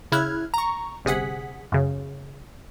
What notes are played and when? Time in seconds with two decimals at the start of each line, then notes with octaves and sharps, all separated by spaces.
0.12 C#3 E4 F6 F#6 G#6
0.54 A#5 C#6
1.05 G1 C3 G#4 F#5 B6
1.72 F#2 C#3